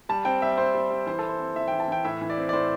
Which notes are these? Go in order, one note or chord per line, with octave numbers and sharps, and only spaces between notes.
G3 A5
C4 G5
G3 E5
C4 C5
G3
G3
E3 C5
E4 A4
C5
C4
E3 E5
E3 G5
A5
E3 G5
A2 E5
E3
D5
C4
D5
A2 C5